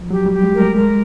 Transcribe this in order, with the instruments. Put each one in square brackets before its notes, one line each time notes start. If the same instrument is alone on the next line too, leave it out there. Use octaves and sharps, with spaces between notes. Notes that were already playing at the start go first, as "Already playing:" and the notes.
Already playing: [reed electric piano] F3
[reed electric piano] F#3 [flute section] G4
[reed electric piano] G3
[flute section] G4
[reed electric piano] G#3
[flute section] A#4
[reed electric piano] A3
[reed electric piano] G#3 [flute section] A#4